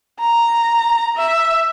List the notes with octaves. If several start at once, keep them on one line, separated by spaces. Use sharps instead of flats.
A#5
E5